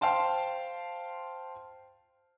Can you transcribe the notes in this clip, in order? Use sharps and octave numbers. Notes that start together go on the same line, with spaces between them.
C5 F5 G5 A5 C6